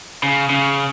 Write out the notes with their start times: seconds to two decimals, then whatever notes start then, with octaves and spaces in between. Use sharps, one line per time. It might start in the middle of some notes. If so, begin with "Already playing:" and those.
0.23 C#3
0.50 C#3